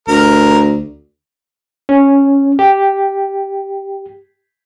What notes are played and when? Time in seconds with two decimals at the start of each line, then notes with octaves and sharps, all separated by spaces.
0.08 D2 A#4
1.89 C#4
2.59 G4